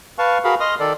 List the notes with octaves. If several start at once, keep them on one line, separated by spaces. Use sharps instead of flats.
B4 F5 A5 C#6
F#4 G#4 A#4 F5 B5
D#5 C6 D#6 F6
D#3 A4 D5